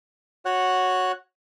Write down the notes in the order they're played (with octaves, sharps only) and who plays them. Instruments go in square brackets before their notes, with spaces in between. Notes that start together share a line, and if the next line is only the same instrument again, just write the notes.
[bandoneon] F#4 C#5 F#5 F#6